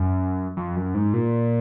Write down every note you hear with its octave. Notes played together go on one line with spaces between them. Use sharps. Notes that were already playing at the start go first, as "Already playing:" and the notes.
Already playing: F#2
F2
F#2
G#2
A#2